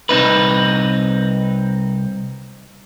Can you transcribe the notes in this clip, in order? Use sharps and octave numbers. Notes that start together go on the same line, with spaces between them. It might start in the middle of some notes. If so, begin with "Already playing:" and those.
C2 C4 D#4 B4